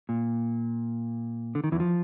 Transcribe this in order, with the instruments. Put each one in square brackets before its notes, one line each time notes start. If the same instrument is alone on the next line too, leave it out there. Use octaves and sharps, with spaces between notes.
[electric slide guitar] A#2
D3
D#3
E2 E3
F3